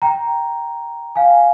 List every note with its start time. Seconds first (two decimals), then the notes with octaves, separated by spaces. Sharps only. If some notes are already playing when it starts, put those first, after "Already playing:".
0.02 G5 A#5
1.16 F5 G#5